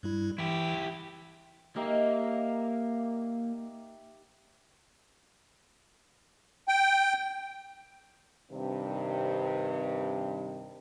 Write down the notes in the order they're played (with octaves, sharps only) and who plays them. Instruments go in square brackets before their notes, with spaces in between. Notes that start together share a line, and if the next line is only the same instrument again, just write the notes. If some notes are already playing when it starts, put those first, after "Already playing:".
[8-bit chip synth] G2 G3 E4
[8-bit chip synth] E3 [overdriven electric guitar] E4 G4
[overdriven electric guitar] A#3 [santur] D#4 G4 E5
[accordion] G5
[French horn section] G2 C3 D#3